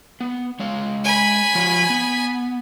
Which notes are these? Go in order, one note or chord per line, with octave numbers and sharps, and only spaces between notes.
B3
G#3 C#5 F5
G#5 B5
F3 F4 C#5
B3